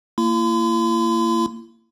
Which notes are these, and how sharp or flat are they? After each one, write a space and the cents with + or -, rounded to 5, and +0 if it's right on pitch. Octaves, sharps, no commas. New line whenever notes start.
A#3 -25 E4 +35 C6 -45